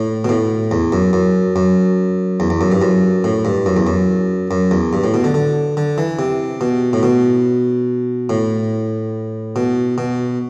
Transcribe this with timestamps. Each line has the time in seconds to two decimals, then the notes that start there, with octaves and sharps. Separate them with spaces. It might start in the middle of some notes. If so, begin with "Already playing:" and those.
Already playing: A2
0.25 B2
0.29 A2
0.71 E2
0.92 F#2
1.13 F#2
1.56 F#2
2.40 E2
2.50 E2
2.61 F#2
2.72 G2
2.82 F#2
3.24 A2
3.45 G2
3.66 F#2
3.77 E2
3.87 F#2
4.51 F#2
4.71 E2
4.93 G2
5.04 A2
5.14 B2
5.24 D3
5.34 D3
5.77 D3
5.98 E3
6.19 C3
6.61 B2
6.93 A2
7.03 B2
8.30 A2
9.56 B2
9.98 B2